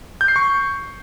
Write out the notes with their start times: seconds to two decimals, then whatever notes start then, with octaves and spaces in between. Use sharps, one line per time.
0.21 G6
0.28 C7
0.36 C#6